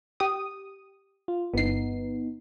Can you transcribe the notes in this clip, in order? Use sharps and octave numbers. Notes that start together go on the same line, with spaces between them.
G4 D#6
F4
G1 B3 D#4 C7